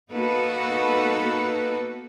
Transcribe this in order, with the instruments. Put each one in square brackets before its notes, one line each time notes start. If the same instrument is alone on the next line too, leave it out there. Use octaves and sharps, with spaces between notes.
[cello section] A#3 B3 D#4 F#4 A4 B4